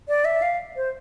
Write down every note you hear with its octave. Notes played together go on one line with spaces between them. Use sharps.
D5
E5
F5
C5